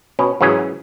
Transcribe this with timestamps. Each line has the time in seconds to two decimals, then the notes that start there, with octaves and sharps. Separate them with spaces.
0.19 B2 C#4
0.41 G#2 E3 F#3 C#4 G#4